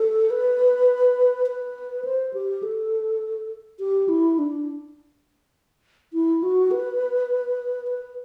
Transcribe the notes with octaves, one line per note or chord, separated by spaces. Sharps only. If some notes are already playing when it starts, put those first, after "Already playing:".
Already playing: A4
B4
B4
C5
G4
A4
G4
E4
D4
E4
F#4
B4
B4